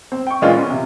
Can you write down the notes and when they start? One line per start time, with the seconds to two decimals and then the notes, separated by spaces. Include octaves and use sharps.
0.12 C4
0.27 G5 C#6
0.42 A#2 E3 G#3 C#4 D4 F4
0.56 B3 C#4
0.70 C3